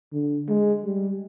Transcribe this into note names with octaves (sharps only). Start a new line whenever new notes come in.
D3
G#3
G3